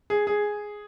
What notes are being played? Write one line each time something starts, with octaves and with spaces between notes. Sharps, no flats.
G#4
G#4